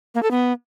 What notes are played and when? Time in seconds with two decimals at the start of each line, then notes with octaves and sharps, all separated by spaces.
0.15 A#3
0.23 A4
0.31 B3